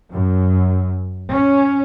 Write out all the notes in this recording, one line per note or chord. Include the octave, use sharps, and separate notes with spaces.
F#2
C#4